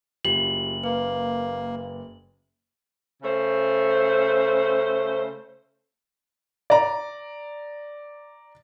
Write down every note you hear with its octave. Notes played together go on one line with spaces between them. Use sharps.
F#1 F4 G4 F#7
A#3 B4
C#3 A3 C5
D5 A#5